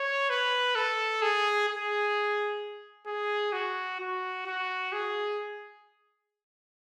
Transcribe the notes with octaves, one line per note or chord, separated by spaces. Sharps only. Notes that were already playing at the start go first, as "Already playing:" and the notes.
Already playing: C#5
B4
A4
G#4
G#4
G#4
F#4
F#4
F#4
G#4